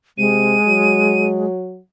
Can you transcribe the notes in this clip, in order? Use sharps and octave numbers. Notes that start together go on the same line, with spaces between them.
C3 G#3 D#7
F#3